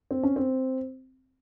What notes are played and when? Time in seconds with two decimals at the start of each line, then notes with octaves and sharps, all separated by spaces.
0.11 C4
0.23 C#4
0.36 C4